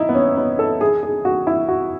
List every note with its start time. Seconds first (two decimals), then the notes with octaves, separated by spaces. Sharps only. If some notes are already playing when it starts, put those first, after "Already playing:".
Already playing: D#4 E4
0.09 B3
0.15 C#4
0.37 B3
0.59 A4
0.81 G#4
1.03 G#4
1.25 F#4
1.47 E4
1.69 F#4